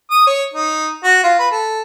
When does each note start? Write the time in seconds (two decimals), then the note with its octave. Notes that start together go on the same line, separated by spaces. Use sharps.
0.11 D#6
0.27 C#5
0.54 D#4
1.04 F#4
1.24 F4
1.39 B4
1.51 A4